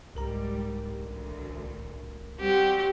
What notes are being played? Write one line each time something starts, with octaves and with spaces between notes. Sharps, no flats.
C2 G#2 G3 A#4 A#5
A1 D2
G3 C4 F#4 G4